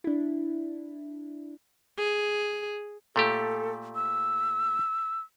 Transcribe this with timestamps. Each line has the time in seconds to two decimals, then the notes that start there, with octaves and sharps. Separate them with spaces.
0.04 D4 E4
1.98 G#4
3.16 A#2 A3 G4 A4
3.95 E6